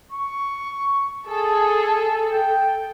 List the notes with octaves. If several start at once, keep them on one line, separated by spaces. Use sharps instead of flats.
C#6
G#4 A4
G5